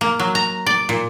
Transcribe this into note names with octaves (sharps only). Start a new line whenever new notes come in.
A#3
F#3
A#5
D5
A#2